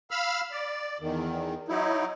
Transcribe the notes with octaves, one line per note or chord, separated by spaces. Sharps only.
F5 B5 E6 F6
D5
E2 D#3
F#3 D#4 E4